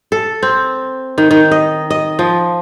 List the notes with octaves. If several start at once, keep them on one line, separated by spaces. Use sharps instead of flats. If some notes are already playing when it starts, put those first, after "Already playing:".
A4
C4
D#3
D#3
D#5
D#5
F3